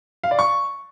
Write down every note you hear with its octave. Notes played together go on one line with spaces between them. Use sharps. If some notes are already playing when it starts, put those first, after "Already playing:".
F5
D5
C#6